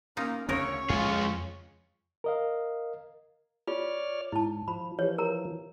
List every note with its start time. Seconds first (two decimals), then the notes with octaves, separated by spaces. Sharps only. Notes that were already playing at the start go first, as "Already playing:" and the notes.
0.17 A#3 C#4 D#4 F4
0.49 D2 C#3 C#4 A#4 C#5 D#5
0.90 F2 G#3 F4 G#4
2.24 A#4 D#5 F5
3.68 F4 C#5 D5 F6
4.32 G#2 E4 A5
4.68 F3 B5
4.99 E3 F3 G4 C#5
5.18 A#4 A#5